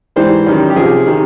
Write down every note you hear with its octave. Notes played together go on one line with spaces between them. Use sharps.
G#2 E3 G3 C5
F#2 D#3 G3
G4
C2 C3 F3 G#4
C3 D#3